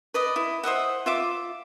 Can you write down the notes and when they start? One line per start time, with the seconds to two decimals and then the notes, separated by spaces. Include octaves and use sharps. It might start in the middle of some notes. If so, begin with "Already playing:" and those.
0.14 B4 D5 D#5
0.36 E4
0.63 C5 D#5 E5 F#5
1.06 F4 E5 D6